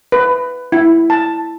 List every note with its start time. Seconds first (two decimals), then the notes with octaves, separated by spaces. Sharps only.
0.12 B4
0.72 E4
1.10 A5